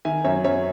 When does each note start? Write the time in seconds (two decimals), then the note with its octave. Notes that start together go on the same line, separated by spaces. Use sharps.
0.05 D#3 E5 G#5
0.24 F#2 C#5 E5
0.44 F#2 C#5 E5